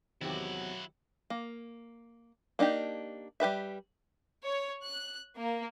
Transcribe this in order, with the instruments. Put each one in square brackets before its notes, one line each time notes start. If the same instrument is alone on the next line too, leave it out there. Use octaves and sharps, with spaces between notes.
[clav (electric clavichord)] E2 C3 [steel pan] D#3 G4 [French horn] F#3 [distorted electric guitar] E4 F#4
[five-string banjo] A#3
A#3 D4 D#4 G4
G3 G4 B4 E5
[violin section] C#5
F#6
A#3